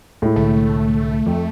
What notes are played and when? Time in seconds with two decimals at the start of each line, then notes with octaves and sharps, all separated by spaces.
0.22 A2 G#3 E4
0.36 C2 D3 A3
1.26 F2